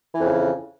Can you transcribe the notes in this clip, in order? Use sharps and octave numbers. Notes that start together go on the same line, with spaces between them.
F2 C#3 E3